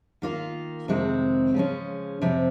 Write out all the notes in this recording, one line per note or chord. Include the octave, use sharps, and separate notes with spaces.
D#3 A#3 F4
F2 C3 D#3 G#3 C4
C#3 F3 G#3 C#4
F2 C3 F3 C4